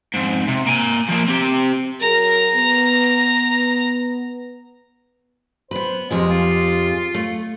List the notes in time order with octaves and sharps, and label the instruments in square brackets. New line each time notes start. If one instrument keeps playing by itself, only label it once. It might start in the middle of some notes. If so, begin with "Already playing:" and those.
[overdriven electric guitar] F2 G#2
C3
A#3 G#5
F3 A#3
C4 G4
[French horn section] F#3 G#4 A#4 [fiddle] A#5
[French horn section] B3
[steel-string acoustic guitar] B3 B4 [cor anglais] C5
[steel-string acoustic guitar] F2 G4 G#4 [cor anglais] G#3
[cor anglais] F4
[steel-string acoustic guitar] A3